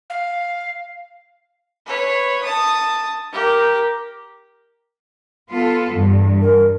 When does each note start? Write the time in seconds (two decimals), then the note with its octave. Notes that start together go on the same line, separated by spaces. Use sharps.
0.09 F5
1.87 B4 C#5
2.43 A5 D#6
3.33 G4 A#4
5.51 B3 F4 A4
5.93 E2 G2
6.42 A#4